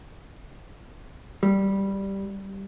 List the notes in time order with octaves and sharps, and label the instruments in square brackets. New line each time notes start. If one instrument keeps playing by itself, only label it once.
[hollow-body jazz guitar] G3